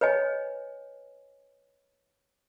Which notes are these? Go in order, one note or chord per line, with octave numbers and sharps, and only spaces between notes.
B4 C#5 D#5 G#5